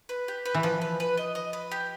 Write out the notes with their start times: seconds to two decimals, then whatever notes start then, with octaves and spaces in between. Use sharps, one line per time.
0.09 B4
0.28 G4
0.46 B4
0.54 E3
0.63 F3 B4
0.82 B4
1.00 B4
1.17 D#5
1.35 D#5
1.53 B4
1.71 G4